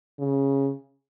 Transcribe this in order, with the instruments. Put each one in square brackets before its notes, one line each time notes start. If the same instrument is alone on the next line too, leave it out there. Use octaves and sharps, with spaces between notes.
[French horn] C#3